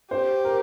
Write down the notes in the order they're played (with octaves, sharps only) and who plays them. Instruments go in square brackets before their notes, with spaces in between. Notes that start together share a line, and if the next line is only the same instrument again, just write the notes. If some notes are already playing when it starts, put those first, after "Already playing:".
[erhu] G4 [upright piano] C5
[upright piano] A#4